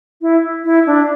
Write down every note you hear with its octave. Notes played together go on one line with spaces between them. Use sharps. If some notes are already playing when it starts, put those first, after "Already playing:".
E4
E4
D4